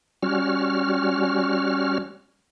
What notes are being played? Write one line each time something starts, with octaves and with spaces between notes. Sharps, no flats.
G3 C#4 F#4 F6